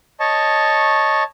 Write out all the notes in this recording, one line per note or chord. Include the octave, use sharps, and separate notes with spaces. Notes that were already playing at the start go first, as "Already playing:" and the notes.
C#5 D#5 A5 C#6